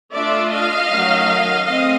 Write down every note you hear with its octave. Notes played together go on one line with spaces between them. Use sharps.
A3 D4 F4 D5 E5
D#5 F5
D#3 F#3 A3 C#4
A3 C4 D#5 F5